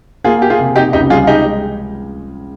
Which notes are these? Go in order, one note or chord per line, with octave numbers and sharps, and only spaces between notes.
A#3 F4 G#4
A#3 G4
F4 G#4
C3
C3 D#4 G4
C#2 D#4 G4
G3 F4 G#4
G#3 D#4 G4
G#3